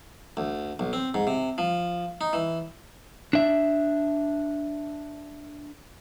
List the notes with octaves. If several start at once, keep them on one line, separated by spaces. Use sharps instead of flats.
D2
B1
C4
G#2
C3
F3
D#4
E3
D4 E5